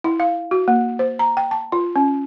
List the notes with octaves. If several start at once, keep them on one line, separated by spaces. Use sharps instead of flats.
E4
F5
F#4
A#3
C5
A#5
G5
A5
F4
C#4